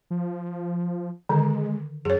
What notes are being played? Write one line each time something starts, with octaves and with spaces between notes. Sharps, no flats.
F3
D3 D#3 G#3
F#2 G#4 C#5